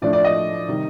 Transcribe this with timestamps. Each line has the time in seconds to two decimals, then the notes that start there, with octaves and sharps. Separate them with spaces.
0.02 A2 F3 A3 D4 D5
0.13 D5
0.24 D#5
0.68 C3 D#3 G3